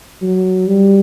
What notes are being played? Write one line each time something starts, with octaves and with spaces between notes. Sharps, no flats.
F#3
G3